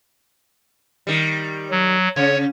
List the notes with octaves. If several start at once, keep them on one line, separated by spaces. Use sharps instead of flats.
D#3 G3
F#3
C#3 C#4 C#5